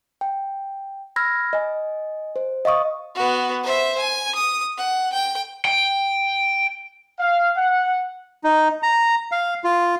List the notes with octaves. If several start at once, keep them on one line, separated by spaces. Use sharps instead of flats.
G5
B5 E6 F6 G#6 A#6
D#5 G#5
C5
D#5 F5 C#6 D#6
B3 F#4
C5 E5
G#5
D#6
F#5
G5
G5
F5
F#5
D#4
A#5
F5
F4